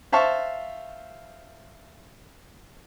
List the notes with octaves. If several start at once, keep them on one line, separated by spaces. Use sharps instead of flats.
C5 E5 F5 A5 C#6